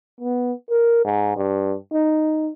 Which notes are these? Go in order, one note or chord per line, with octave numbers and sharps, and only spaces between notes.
B3
A#4
G#2
G2
D#4